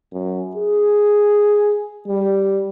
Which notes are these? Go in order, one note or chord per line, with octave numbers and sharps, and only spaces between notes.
F#2
G#4
G3